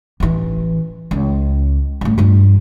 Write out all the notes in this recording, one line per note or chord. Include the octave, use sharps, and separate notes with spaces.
A1 E3
C#2
F#2 A2
G2 F3